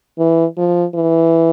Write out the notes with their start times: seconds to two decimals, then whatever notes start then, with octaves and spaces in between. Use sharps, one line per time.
0.18 E3
0.57 F3
0.95 E3